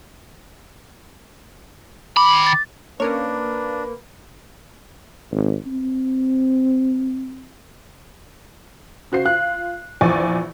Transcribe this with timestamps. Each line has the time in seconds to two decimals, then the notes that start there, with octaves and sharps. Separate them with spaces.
2.17 D#3 B5 D6
2.47 A6
3.00 A#3 C#4 D4 A#4 B4 C#5
5.32 G#1
5.66 C4
9.12 C#3 F#4 C5 C7
9.25 F4 F#6
10.01 A#1 E2 F3 D5 G#5 C#6